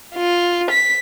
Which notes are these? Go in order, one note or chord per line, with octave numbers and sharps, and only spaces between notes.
F4
B6